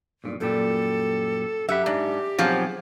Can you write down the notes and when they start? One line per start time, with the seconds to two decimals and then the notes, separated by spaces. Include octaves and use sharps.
0.24 B1 G2 A#2
0.40 F#2 A#2 G3 A4
1.69 F#2 G4 E5 F#5 B5
1.86 G#2 D4
2.39 B1 F3 F#3 C4 G#4